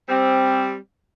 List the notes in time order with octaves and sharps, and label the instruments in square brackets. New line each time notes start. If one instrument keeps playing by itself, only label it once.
[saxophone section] G3 C4